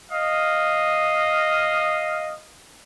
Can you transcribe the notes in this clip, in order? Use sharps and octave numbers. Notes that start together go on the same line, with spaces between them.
D#5 F5